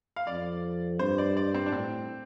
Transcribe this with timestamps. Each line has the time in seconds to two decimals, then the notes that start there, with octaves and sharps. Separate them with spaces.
0.16 F5
0.27 F2 D5
0.99 G2 C5
1.18 D5
1.37 D5
1.54 C4
1.66 D4
1.72 A2 C4